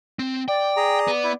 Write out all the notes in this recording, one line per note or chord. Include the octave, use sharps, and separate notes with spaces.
C4
D5 G5
G#4 A#5
B3
E4